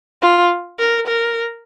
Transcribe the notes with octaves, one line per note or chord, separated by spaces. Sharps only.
F4
A#4
A#4